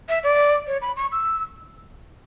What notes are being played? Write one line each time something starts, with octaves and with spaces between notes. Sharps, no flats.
E5
D5
C#5
B5
C#6
E6